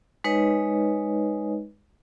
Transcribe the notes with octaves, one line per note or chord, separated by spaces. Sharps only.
G#3 D#4 B4 C#5 D#5